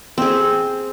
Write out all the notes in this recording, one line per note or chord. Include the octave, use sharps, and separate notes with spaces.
C4 G#4